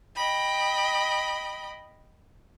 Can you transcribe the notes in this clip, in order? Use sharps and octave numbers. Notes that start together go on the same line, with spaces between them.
D#5 G5 B5